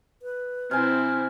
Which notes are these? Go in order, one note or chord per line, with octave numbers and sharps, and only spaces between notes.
B4
C3 C4 E4 G#5 F6